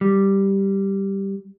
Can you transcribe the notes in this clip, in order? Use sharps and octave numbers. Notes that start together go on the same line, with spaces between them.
G3